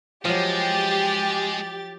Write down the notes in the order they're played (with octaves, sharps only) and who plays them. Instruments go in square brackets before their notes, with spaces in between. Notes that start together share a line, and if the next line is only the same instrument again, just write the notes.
[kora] F3 F#3 [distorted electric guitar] G#3 [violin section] G4 A6